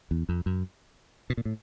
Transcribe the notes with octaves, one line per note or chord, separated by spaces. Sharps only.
E2
F2
F#2
B2
A#2
A2